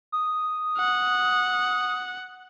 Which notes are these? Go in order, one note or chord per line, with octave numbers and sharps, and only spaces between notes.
D#6
F#5